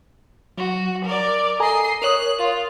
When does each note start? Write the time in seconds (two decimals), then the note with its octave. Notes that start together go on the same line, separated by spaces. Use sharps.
0.58 F#3 F#4
1.04 A#4 D5
1.60 A4 D#5 G#5 A#5 C7
2.02 A#4 C#5 D#6 F#6
2.38 F4